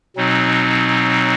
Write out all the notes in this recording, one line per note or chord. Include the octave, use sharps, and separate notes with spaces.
B2 F#3 C4 D#4